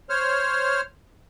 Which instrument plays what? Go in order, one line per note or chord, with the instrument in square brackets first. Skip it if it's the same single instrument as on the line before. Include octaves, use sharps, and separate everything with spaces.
[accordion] C5 C#5 F6